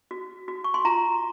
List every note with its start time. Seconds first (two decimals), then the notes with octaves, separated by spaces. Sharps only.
0.11 F#4
0.48 F#4
0.64 C#6
0.74 C6
0.85 F4 A#5